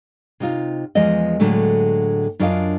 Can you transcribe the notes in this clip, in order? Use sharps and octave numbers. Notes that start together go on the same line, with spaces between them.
C3 D#4 F4
E2 F3 G#3 A#4 D#5
A2 D3 F#3 G#3 A3
F#2 D4 F4 A#4 D#5 F5